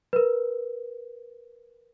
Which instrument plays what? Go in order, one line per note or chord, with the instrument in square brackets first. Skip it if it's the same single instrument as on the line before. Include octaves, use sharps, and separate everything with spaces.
[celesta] A#4 B4